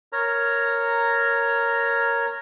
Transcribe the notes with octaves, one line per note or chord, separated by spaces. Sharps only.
A#4 C#5 A#5